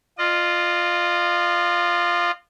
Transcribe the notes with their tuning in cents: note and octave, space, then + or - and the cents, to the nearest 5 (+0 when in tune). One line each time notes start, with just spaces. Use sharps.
F4 +0 D#5 -40